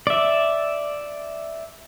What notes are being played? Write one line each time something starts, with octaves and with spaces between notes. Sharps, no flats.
D5 E5